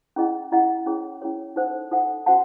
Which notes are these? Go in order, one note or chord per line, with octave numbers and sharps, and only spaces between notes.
C#4 E4 G#4 D#5 F#5
C#4 E4 G#4 D#5 F#5
C#4 E4 G#4 C#5
C#4 E4 G#4 C#5
D#4 A4 C5 F#5
D#4 A4 C5 F#5
C#4 F#4 C5 F#5 A5